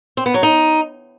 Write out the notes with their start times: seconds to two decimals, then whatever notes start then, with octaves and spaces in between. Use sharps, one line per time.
0.17 C4
0.26 B3
0.34 F#3
0.43 D#4